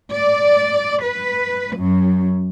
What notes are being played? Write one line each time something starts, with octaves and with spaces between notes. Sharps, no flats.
D5
B4
F#2